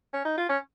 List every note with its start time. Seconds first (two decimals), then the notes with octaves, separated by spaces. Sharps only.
0.14 C#4
0.25 D#4
0.38 F4
0.49 C#4